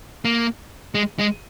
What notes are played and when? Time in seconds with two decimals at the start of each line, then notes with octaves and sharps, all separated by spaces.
0.25 A#3
0.95 G#3
1.19 G#3